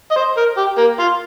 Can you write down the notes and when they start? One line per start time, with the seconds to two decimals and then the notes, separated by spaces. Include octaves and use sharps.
0.11 D#5
0.16 C5
0.37 A#4
0.57 G4
0.77 A#3
0.99 F4